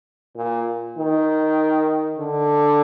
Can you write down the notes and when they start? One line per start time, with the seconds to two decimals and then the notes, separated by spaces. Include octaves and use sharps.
0.36 A#2
0.97 D#3
2.19 D3